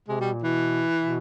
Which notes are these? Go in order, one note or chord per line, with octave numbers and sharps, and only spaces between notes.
C3 G#3
B2 G3
A#2
B2 E3
B2